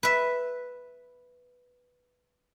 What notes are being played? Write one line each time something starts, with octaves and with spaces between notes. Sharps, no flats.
B4 E5